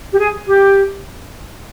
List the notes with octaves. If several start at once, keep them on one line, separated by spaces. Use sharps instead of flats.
G4
G#4
G4